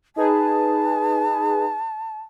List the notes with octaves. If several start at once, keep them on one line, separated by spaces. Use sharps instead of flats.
D#4 G#4 B4 A5